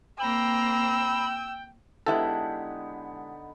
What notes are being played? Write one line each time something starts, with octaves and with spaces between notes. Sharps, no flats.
A#3 C4 G5 A#5 B5 E6
D3 G#3 B3 D#4 E4 G4 A4